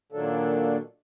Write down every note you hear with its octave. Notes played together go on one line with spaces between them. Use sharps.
A#2 D#3 F#3 A#3 D4 A4